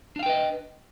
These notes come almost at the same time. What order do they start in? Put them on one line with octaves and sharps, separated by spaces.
D4 F5 G5 B4 D#5